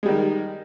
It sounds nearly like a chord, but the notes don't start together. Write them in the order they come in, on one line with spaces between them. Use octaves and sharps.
G#3 G3 D#3